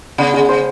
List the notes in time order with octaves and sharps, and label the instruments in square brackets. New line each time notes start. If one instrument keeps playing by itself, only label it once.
[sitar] C#3 [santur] B3
[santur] G#3
C5